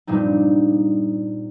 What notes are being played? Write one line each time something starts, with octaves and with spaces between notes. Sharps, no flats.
G2 A#2 G3 C4 D#4